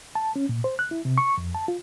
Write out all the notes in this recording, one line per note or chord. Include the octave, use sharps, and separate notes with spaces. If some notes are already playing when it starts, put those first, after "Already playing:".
A5
C#4
A#2
C5
F#6
E4
C3
C#6
F2
A5
F4